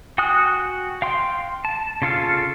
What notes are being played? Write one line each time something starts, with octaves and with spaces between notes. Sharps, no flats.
F#4 G5 G#5 D#6 F#6
F5 G5 C6
A5
C#3 F4 A4 F5